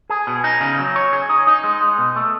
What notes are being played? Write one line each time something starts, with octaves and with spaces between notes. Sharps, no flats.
G#4
B2
D#4
C#3
F#3
C#5
G#4
D#4
D#4
G#3
G#3
B2
A3